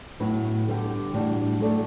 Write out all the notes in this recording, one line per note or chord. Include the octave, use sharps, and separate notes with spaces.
A2 F#3 B3 E4 B4
D3 G3 B3 E4 G4
A2 E3 G3 D4 F#4
F#3 A3 E4 A4 D5